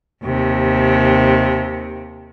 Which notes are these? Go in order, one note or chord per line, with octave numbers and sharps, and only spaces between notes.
D#2 C3